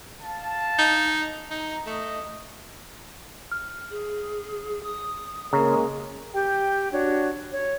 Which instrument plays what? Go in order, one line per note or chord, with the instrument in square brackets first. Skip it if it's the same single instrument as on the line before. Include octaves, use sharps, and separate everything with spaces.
[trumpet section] F5 A5
[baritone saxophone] D#4
[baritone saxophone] D#4 [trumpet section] A#5
[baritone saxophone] A3 [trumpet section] D#5
[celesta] F6
[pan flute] G#4
D#6
[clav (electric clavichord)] C#3 [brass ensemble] G#3 A#3 [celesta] A#5
[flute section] G4 G5
D4 F#4 C#5
C#5